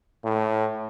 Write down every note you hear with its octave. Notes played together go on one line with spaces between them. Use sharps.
A2